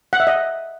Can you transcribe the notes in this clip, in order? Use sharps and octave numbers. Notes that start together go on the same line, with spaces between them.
F#5
E5
D#5